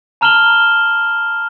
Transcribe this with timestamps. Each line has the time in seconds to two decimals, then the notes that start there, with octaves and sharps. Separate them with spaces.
0.21 A5 A#5 F6 E7 F#7 G7